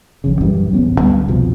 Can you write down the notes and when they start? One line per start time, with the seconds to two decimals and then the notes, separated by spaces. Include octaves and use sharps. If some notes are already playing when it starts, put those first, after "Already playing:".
0.24 G#1 F2 C#3
0.41 A#1 F#2 E3 G3
0.73 D1 A1 B3 C#4
0.99 D2 D3 G3 B3
1.28 C2 F2 B2 F3